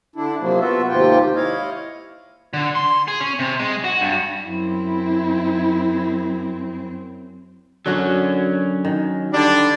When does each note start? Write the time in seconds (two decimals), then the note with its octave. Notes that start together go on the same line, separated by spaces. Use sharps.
0.16 D3 D4 E4
0.40 C3 F3 F#3 A#3
0.60 B3 F4 F#4 E5
0.89 D#2 G#2 C3 F4 G4 G5
1.35 E4 C#5 D#5 F5
2.53 D3
2.75 C6
3.08 G#4
3.20 C#4
3.39 C3
3.59 G#3
3.84 F#4
4.01 G2
4.46 F#2 C4 E4
7.86 D3 F#3 C#4 F#4
8.85 D#3
9.32 D3 G3 D4